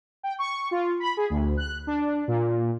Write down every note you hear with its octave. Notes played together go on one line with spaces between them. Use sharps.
G5
C#6
F4
B5
G#4
D2
F#6
D4
A#2